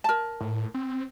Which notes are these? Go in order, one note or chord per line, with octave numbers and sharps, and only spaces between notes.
A#4 A5
A2
C4